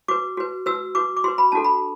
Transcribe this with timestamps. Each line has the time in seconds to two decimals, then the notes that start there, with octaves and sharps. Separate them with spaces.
0.08 F#4 B4 D6
0.37 F#4 B4
0.66 F#4 B4 E6
0.95 F#4 B4 D6
1.17 D6
1.24 F#4 B4 C6
1.38 B5
1.52 D4 F#4 A4 A5
1.64 B5